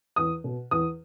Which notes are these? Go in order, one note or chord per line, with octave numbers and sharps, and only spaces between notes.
E2 D#6
B2
E2 D#6